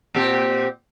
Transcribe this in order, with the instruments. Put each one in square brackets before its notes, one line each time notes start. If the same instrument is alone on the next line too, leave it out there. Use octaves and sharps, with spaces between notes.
[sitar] A#2 C4 G4